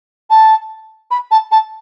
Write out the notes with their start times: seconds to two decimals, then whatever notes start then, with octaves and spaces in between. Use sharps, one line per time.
0.30 A5
1.11 B5
1.31 A5
1.51 A5